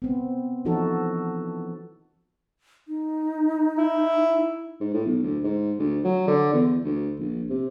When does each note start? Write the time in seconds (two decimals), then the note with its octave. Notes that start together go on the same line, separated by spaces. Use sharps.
0.02 B3 C4
0.65 E3 F3 D#4 F#4 A4
2.88 D#4
3.78 E4
4.80 G#2
4.94 A2
5.06 B1
5.23 D2
5.44 G#2
5.79 D2
6.04 F#3
6.27 D3
6.53 E2
6.84 D2
7.19 A#1
7.49 C3